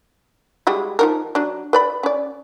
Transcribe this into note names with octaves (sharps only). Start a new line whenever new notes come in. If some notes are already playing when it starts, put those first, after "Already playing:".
G3 G#3 F#4
F3 D#4 A#4
F#3 D4
B4 D5 B5
C#4 D5